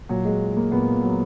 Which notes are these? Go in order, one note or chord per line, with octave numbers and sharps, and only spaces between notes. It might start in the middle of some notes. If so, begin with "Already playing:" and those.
A#2 F#3
G#3
A#3
A#2 B3
F#3